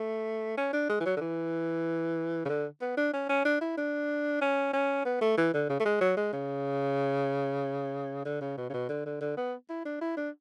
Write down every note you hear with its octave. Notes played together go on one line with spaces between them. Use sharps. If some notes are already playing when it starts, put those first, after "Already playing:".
Already playing: A3
C#4
D4
G#3
E3
F#3
D3
E3
C#3
D3
B3
D4
C#4
C#4
D4
E4
D4
C#4
C#4
B3
A3
E3
D3
C#3
A3
G#3
F#3
G#3
C#3
D3
C#3
B2
C#3
B2
D3
D3
D3
B3
E4
D4
E4
D4